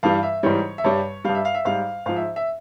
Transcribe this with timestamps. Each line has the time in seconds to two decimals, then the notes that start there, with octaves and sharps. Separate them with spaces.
0.03 G2 E3 G3 F5
0.23 E5
0.43 G#2 E3 G3 C#5
0.78 E5
0.84 G2 G3 C#5
1.24 G2 G3 F5
1.35 E5
1.45 F5
1.54 E5
1.65 G#2 G3 F5
2.06 G#2 F3 F5
2.16 E5
2.36 E5